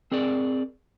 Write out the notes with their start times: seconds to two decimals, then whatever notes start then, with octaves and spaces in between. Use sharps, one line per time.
0.12 C4 G#4 A#4 D5